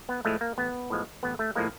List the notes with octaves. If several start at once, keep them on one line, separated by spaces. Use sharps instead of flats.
B3
A2 F3 G#3 A3
A#3
A1 B3
A2 F3 G#3
A1 B3
A3
A2 F3 G#3 A#3